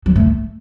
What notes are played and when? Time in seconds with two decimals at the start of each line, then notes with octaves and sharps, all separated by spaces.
0.06 F#3
0.16 A3